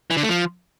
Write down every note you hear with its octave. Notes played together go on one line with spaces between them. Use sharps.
E3
D3
A3
F3